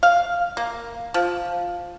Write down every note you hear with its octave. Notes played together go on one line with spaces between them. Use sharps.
F5
A#3
F3